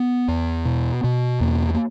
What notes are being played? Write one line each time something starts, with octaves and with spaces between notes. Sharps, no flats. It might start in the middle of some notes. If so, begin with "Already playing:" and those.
Already playing: B3
E2
B2
B2
E2 A#3
A#3